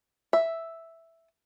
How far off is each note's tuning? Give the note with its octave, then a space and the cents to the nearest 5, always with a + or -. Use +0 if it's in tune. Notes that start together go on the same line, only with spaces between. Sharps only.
E5 +0